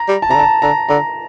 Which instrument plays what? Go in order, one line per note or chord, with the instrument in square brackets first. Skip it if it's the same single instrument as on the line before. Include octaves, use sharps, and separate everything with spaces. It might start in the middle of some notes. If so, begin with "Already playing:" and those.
Already playing: [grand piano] A#5
[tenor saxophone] G3
[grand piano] A5
[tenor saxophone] C3 [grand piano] A#5
[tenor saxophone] D3
[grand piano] A5
[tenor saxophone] D3 [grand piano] A#5
[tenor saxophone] D3 [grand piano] A#5